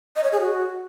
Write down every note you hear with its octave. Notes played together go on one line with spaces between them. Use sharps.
D#5
C#5
G#4
F#4